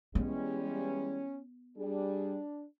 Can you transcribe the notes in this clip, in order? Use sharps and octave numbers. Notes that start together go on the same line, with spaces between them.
E3 G3 G#3 B3 C#4
G3 D4 G#4